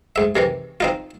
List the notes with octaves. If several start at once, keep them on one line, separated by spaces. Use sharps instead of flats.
G#2 E5
C3 D#3 E3
C4 D#4 F4